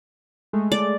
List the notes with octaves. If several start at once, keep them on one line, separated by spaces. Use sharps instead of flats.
G#3 A3
D5